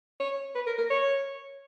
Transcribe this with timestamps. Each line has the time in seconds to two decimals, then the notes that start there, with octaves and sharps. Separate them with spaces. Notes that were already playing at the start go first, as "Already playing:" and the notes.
0.20 C#5
0.55 B4
0.66 A#4
0.78 A#4
0.90 C#5